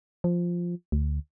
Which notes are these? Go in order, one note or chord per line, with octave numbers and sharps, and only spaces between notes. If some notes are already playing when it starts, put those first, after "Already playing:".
F3
D2